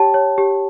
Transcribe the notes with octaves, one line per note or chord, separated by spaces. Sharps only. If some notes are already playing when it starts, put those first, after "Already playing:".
Already playing: G4 C#5 G5 A5
C#5
G4